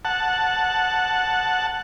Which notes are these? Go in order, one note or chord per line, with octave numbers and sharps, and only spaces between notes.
F#5 A5